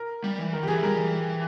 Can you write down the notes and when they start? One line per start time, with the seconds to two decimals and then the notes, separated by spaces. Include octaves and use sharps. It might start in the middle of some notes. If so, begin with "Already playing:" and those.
Already playing: A#4
0.24 G3
0.38 E3
0.53 D#3 A#4
0.63 G4
0.68 E3 G#4
0.83 G3 A#4
0.98 E3